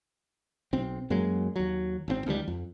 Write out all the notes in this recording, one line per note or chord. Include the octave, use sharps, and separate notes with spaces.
B1 C4
F#2 F#3 G#3 A#3
D#2 F#3
G#1 B2 C4
C#2 D#3 F3 G3
F2